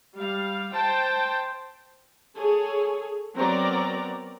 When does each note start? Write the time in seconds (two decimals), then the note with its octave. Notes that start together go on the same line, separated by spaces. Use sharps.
0.16 G3 F5
0.73 C5 G5 A5
2.36 G#4 A4 C#5
3.34 F#3 B3 C4 A#4 D5 A#5